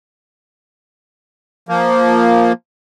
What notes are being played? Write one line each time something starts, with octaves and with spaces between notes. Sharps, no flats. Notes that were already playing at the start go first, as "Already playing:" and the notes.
F3 A#3